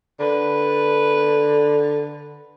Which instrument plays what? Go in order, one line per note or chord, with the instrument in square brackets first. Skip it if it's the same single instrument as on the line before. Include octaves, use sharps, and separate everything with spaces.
[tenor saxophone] D3 [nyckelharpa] B4